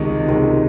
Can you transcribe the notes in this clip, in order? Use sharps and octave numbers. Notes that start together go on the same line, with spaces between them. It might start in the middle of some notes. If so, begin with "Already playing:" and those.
Already playing: C#2 C3 D#3 G#3
C#2 C3 D#3 G#3